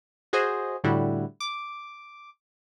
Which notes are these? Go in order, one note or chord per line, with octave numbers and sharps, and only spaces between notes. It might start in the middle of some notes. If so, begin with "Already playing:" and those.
F#4 G#4 C5 D#5
A2 D3 G3 E4 F#4
D6